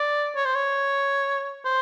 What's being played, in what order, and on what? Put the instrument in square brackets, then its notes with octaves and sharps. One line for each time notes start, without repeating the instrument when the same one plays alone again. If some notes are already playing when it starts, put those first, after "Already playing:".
Already playing: [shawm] D5
C#5
C5
C#5
C5